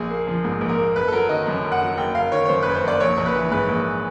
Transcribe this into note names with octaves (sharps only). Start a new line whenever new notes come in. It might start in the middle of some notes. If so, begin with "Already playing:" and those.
Already playing: A#1 G#4
A#3
F3
G#2
A#1
A#4
A#3
F#1 B4
A4
F#3 A#4
D#3 D#5
F#2
F#1
F#5
F#3
F#1 G5
F#1 F5
D#3 C#5
C#5
F#2 C5
F#1 B4
C5
F#1 D5
A#1 C#5
A#1
B4
E3
G#2 B4
A#1